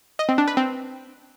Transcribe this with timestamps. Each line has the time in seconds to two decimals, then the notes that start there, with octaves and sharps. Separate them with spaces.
0.19 D#5
0.29 C4
0.38 D4
0.47 B4
0.57 C4